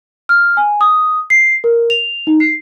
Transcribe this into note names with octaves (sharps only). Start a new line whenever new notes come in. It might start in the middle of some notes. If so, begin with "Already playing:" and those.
F6
G#5
D#6
C7
A#4
F7
D#4
C7